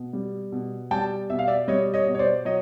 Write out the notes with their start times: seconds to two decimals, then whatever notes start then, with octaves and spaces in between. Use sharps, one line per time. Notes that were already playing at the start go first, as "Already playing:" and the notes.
Already playing: B2
0.13 G3
0.52 B2
0.91 G3 G5 A5
1.30 B2 E5
1.39 F5
1.48 D5 E5
1.68 G3 C#5 D#5
1.94 C#5 D#5
2.07 B2
2.15 C#5
2.19 C5 D5
2.45 F#3 C#5 D#5